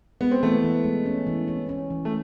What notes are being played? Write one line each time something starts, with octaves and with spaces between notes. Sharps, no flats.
G#3 B3
C4
E3 A3 B3
E3
G#3
C#4
E3
C#4
C#4
E3
A3